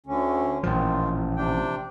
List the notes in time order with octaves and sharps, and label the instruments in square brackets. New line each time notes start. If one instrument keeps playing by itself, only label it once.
[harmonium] D2 D3 C#4
[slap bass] A1 A#2 F3 [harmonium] D#3 F4
[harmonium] C3 D4 G5